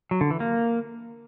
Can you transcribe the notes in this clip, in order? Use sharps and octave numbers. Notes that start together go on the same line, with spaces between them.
F#3
D3
E3
A#3